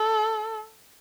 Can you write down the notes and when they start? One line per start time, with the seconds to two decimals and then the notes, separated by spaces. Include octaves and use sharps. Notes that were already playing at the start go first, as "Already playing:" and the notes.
Already playing: A4